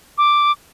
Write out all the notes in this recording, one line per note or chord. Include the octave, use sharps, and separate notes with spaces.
D6